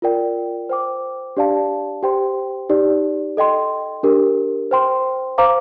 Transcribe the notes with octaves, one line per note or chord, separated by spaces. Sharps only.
F4 A#4 D5 G5
C5 G5 D6
D4 G4 D5 F5 A5
G4 C5 G5 C6
D#4 G4 D5
A4 D#5 G5 C6
D4 G4 A#4
C5 G5 C6
C5 F5 A#5 D6